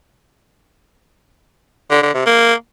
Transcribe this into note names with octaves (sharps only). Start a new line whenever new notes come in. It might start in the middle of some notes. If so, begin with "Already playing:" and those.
D3
D3
C3
A#3